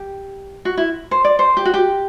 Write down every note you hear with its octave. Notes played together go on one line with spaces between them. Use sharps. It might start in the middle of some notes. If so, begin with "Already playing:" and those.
Already playing: G4
F#4
E4
C5
D5
C5
G4
F#4
G4